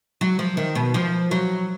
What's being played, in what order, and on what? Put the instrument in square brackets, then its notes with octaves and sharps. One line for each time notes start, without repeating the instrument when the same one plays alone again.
[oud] F#3
F3
D#3
B2
F3
F#3